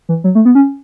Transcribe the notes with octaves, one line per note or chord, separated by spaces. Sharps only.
E3
F#3
A3
B3
C#4